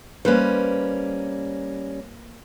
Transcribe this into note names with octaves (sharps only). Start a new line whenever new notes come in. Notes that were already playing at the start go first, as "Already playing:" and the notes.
G3 A#3 C#4 B4 C5